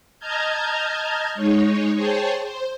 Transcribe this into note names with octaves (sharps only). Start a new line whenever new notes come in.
D#5 A5 A#5 F6 G6 G#6
G#3 D#4 C#5
G#4 C5 C#5 G5 A5
C5